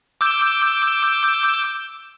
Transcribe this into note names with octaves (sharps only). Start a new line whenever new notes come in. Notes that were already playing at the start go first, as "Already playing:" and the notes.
D6 E6 G6